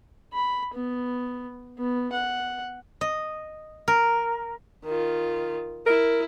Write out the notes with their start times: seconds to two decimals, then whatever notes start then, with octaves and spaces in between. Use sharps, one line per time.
0.33 B5
0.74 B3
1.79 B3
2.13 F#5
3.01 D#5
3.88 A#4
4.84 D#3 F4
5.86 E4 A#4